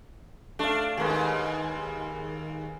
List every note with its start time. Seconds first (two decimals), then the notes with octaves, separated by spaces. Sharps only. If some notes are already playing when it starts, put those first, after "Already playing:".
0.59 A3 D4 F5
0.97 D#2 G#3 G#4 A#4 B4